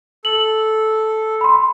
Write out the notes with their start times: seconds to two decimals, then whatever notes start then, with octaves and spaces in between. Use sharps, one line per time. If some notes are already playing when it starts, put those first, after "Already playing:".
0.25 A4 F#7
1.41 B5 C6